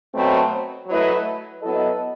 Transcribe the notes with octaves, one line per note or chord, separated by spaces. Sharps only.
B2 F#3 A3 C4
F#3 A3 E4 B4 D#5
F#3 B3 E4 A4 D#5